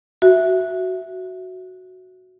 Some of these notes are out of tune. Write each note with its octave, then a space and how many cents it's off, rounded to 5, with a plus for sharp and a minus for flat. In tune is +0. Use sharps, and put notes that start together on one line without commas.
F#4 +0 E5 +0